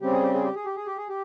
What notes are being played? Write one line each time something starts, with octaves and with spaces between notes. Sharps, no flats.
C#3 G3 C4 G4
G#4
G4
G#4
G4
G#4
G4
G#4
G4
G#4
G4